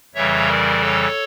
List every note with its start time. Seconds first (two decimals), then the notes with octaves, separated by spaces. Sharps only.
0.14 F2 C#3 E3 G3 C#5 E5
0.48 A#4 D5
0.80 A4 C#5